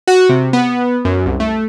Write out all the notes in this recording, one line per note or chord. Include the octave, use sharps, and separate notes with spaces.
F#4
C3
B3
F#2
C2
A3